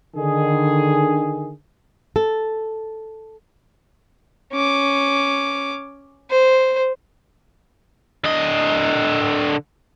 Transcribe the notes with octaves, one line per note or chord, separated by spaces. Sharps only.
D3 D#3 G#4
A4
C#4 D6
C5
D3 D#5